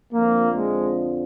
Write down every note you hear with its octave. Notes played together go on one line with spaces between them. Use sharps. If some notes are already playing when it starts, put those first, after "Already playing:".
F2 D3 F3 A#3
G#3